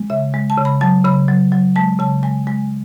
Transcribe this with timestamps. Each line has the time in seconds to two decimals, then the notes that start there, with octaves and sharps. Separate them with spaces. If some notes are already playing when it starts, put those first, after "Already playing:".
Already playing: G#3
0.10 C#3 E5
0.34 G#3
0.50 A5
0.57 C#3
0.65 B5
0.81 F#3 A5
1.05 C#3 B5
1.28 F#3
1.52 F#3
1.76 G#3 A5
1.99 C#3 A5
2.23 G#3 G#5
2.47 G#3 G#5